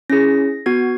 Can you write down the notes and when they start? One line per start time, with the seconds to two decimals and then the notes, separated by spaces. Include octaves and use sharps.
0.10 C#4 E4 G#4 A#6
0.66 B3 F#4 G#6